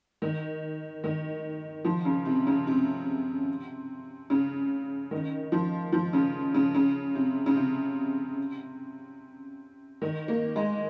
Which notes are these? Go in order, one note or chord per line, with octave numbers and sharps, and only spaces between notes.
D#3
D#3
F3
C#3
C3
C#3
C3
C#3
D#3
F3
F3
C#3
C#3
C#3
C3
C#3
C3
D#3
A#3
G#3